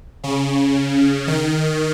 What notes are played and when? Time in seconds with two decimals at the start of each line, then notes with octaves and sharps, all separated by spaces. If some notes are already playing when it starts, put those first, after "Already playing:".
0.24 C#3
1.28 D#3